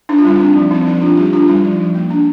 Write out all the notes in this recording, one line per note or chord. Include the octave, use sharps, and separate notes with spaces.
D4 D#4
F4
G3 D#4
C4 D4
F3
C4 D#4
F3 D#4
D4 F4
G3 G4
D4 F4
G3 D#4
F3
F3
A#3
D4